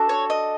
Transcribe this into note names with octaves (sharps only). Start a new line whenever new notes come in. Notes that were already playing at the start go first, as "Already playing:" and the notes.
Already playing: D4 F#4 A4
C#5
D#5